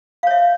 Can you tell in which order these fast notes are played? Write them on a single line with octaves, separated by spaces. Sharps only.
F5 C#5 E5